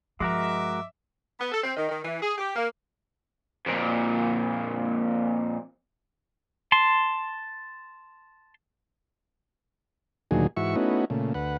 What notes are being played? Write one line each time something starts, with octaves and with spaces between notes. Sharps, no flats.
G2 F3 G#3 F#4 A#4 D#5 E5 D6
B3
A4
C4
D#3
D#3
E3
G#4
G4
A#3
F2 A#2
A5 C6
D2 A#2 D#3 F#3 G#4
G#2 E3 F#4 E5 C#6
A3 B3 C#4 D#4 E4 F#4
A#2 C#3 A3
D2 B4 F#5